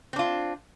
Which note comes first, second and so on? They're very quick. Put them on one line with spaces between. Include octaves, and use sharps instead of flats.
C4 D4 F4